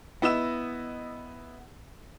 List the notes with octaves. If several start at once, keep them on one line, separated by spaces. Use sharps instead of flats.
B3 E4 D#5 E6 E7